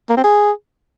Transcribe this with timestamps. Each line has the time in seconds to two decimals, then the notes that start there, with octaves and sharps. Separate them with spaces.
0.09 A#3
0.17 C4
0.24 G#4